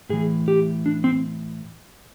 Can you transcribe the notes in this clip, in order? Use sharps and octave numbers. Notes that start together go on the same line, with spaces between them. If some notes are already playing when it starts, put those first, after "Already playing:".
A2 E3 G#4
G4
D4
C4